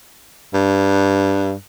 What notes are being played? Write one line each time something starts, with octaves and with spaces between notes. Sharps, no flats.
G2